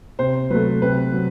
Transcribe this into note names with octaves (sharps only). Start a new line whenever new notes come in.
C3 C5
F#3 A3 B4
C3 B4
F#3